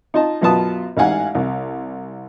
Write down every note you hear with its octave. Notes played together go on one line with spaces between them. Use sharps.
D#4 F4 D#5 A5
F#2 B2 B3 F4 A5 D#6
A1 G#2 F5 F#5 G#5
C2